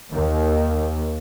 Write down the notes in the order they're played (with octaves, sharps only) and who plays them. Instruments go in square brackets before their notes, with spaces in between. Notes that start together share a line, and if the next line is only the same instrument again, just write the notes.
[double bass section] D#2